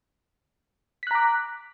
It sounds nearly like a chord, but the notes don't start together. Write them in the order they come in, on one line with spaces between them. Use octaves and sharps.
B6 F#6 A#5 D6